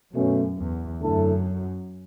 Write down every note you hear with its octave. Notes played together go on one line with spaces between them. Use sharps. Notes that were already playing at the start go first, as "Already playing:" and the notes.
F#2 B2 A3 C#4
E2
F#2 D3 A3 E4 A4